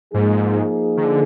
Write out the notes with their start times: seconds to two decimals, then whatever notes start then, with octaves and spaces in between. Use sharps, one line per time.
0.13 G#2 F3 A#3 D#4 G#4
0.97 D#3
1.04 D3